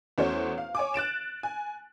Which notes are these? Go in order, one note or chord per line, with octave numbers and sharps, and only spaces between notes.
E2 A3 C#4 F#4 C5 C#5
F5
C#5 G#5 D6
F#6 A6 D7 E7
G#5